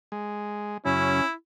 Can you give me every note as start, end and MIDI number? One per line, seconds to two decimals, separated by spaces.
0.12 0.77 56
0.85 1.21 42
0.85 1.21 49
0.85 1.25 61
0.85 1.32 64